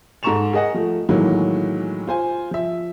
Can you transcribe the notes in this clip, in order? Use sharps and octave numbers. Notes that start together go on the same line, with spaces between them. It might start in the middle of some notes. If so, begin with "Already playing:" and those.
G#2 A4 A#5 C#6 E7 F7
G#4 A#4 D#5 F#5
F3 A3
A2 D#3 E3 F#3 G#3 A#3
F4 C5 G#5
F3 E5